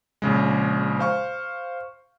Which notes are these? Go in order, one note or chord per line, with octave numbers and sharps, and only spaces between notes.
A#1 C#3 G#3
C5 F5 C#6